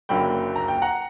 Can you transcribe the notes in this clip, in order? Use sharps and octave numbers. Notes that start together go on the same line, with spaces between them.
F#1 F#2 D3 F#3 A#3 G5 B5
A#5
G5
F#5 A#5